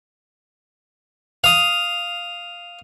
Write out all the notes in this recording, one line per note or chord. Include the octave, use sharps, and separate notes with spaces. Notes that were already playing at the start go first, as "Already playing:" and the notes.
F5 D#6